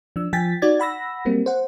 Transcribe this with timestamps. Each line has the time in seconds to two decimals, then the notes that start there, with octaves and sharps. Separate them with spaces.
0.16 F3 D4 E6
0.33 F3 G5 G#5 A6 B6
0.62 D#4 F#4 D5 G#6 A6
0.80 F#5 B5 E6 A#6
1.25 F#3 G3 A#3 C4
1.46 C5 F#5